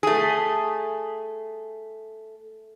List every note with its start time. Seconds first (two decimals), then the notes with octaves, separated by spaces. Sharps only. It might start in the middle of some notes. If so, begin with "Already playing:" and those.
0.03 A3 G#4